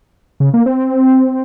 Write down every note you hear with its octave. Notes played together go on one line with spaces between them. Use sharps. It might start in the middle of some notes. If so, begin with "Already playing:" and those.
C#3
A#3
C4